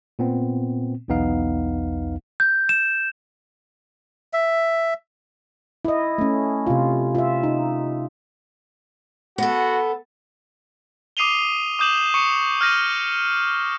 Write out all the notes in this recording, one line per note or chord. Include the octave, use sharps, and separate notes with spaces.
A#2 B3 C4
B1 E2 B3 D#4 F5
G6
E7
E5
E4 D#5
A3 C#4
C3 F4
F4 E5
D#4
B3 F#4 A4
D6 D#6 C7 D#7 F7 G7
D6 D#6 G6 E7 F#7
C#6 C#7
F6 G6 A#6 D#7